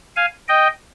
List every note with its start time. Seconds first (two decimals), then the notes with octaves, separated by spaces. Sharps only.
0.16 F5 G#5
0.48 D#5 G5